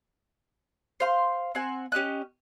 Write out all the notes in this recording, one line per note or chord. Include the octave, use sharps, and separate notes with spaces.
C5 F5 C6
C4 F#5 G#5
C#4 G4 D#5 F#6